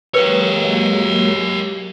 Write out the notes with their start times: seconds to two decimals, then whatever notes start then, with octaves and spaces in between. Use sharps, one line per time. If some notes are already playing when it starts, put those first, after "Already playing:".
0.14 F#3 G#3 A#3 G4 A#4 B4 C#5